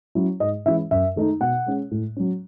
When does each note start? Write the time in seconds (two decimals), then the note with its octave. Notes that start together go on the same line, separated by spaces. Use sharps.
0.15 F#3 C#4 E4
0.40 G#2 D#5
0.66 E3 G#3 C#4 E4 E5
0.91 F#2 E5
1.16 D#3 A3 D#4
1.41 B2 F#5
1.66 G#3 C#4
1.91 A2
2.16 F#3 C#4